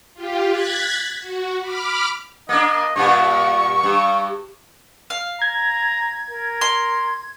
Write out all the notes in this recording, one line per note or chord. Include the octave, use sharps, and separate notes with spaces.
F4 G4
F#6 G#6 A6 B6
F#4
B5 D6 F6
A#3 D4 D#5
G2 A#2 B3 C#6
G2
F5
A#5 G#6
A#4
C6